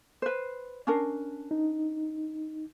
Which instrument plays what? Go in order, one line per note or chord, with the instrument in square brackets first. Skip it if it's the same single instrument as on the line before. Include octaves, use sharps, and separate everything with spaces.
[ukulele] B4 C5
C#4 D4 A#4
[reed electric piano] D#4